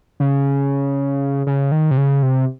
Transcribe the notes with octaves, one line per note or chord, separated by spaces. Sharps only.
C#3
C#3
D#3
C3
C#3
C3